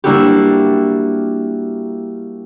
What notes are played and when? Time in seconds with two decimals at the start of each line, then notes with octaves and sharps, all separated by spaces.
0.04 G3 A#3 D4 E4 F#4 G4